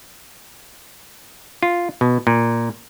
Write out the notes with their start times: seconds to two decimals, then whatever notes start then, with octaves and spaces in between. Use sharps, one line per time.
1.63 F4
2.01 B2
2.27 A#2